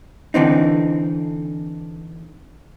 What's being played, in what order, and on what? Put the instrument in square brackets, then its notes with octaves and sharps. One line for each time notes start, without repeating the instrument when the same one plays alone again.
[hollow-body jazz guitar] D3 E3 C4 D#4